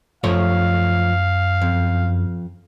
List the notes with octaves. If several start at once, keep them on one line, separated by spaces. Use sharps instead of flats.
F#2 F3 A3 C#5 F5
F2